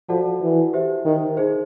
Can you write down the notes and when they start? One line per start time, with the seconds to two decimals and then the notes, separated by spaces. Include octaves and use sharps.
0.09 F3 F#4 A4 D5 F#5 A5
0.42 E3
0.73 G4 C5 E5
1.05 D#3
1.37 D#4 G#4 C5